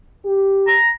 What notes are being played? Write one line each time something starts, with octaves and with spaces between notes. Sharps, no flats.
G4
A#5